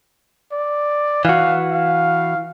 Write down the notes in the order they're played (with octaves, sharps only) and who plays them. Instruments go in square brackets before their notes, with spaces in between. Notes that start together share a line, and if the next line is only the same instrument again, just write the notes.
[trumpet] D5
[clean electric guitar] E3 F#4 [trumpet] F5
[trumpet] F5